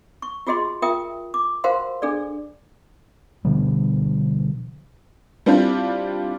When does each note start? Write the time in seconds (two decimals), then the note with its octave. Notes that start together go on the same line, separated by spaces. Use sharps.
0.22 C#6
0.47 F4 F#4 G#4 D#5 C6
0.82 F4 A#4 E5 G5 D#6
1.34 D6
1.64 F#4 A#4 C5 F5 F#5 C6
2.02 D4 G#4 A4 D5
3.45 B2 D3 F3 G3
5.46 G3 C4 D4 E4 F4 G4